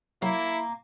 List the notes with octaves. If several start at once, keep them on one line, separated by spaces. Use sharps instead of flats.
F#3 A#3 E4